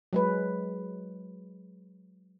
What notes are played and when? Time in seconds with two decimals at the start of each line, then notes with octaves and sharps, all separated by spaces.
0.13 F#3 G#3 B4